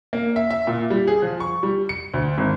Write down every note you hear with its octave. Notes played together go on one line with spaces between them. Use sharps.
A#3
E5
E5
A#2
G3
G#4
F3
C#6
G3
C#7
D2
G#1